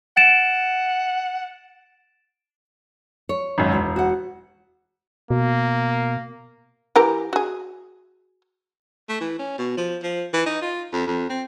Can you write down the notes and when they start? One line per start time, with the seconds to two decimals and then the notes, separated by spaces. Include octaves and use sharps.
0.17 F#5 A6 D7 E7
3.29 C#5
3.58 G#1 F#2
3.73 E1
3.96 F#4 F#5
5.30 B2 A#3
6.96 E3 G4 A#4
7.33 F#4 G#4
9.09 A3
9.21 E3
9.39 C#4
9.58 B2
9.77 F3
10.03 F3
10.34 E3
10.46 D#4
10.62 F4
10.93 F2
11.07 F2
11.30 C4